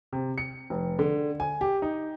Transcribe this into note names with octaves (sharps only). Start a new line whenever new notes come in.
C3
C#7
F1
D3
G#5
G4
D#4